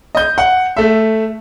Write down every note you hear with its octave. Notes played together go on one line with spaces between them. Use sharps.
D#5 G6
F#5
A3 E5